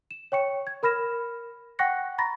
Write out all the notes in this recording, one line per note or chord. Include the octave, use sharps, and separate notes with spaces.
E7
C#5 G5 C#6 C#7
G#6
A#4 B5 F6 A#6 E7
F#5 G5 C#6 F#6 A#6 C#7
A#5 B5 C#6 A6 A#6